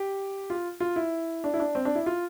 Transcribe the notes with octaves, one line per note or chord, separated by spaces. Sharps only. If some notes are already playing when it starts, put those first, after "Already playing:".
Already playing: G4
F4
F4
E4
D4
E4
D4
C4
D4
E4
F4